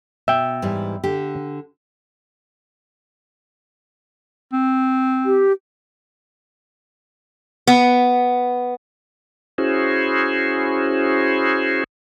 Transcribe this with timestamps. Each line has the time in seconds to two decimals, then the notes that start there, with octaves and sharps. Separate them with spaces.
0.28 B2 E5 G5
0.62 G#2 E3 G3
1.04 D3 G4
4.53 C4
5.26 G4
7.67 B3
9.58 C#4 E4 F#4 G#4 C5